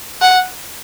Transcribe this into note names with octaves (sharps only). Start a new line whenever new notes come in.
F#5